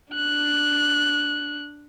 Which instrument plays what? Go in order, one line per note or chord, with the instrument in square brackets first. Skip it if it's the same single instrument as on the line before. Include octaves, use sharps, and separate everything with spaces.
[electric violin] D4 F#6